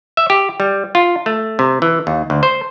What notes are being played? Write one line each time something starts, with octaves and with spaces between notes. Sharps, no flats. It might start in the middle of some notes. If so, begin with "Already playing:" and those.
E5
G4
G3
F4
A3
C3
E3
D#2
D2
C5